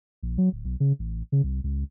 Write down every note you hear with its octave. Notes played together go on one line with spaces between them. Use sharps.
A#1
F#3
D1
B1
C#3
A1
C#3
C2
C#2